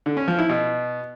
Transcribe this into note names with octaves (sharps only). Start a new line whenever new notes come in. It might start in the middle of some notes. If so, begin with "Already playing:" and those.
D3
C#4
F3
E4
B2